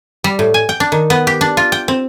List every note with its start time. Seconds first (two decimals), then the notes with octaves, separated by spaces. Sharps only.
0.24 G3
0.39 A2
0.54 G#5
0.69 G5
0.80 D4
0.92 D#3
1.10 B3
1.27 G4
1.41 D4
1.57 F4
1.72 G5
1.88 C4